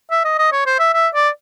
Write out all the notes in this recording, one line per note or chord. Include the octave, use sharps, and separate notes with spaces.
E5
D#5
D#5
C#5
C5
E5
E5
D5